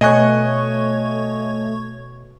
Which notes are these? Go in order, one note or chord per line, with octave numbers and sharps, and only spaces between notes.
B2 A3 C#5 D#5 G#5 C#6 F#6 G#6